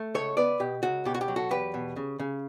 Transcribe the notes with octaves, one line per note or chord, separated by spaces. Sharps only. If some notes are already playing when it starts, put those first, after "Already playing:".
Already playing: A3
C#2 A4 C#5
B3 B4 D5
B2 G4
C#2 F#4
B2 G4
F#4
G4
F#3
F#4 A4
E2 G4 B4
B2
C#3
C#3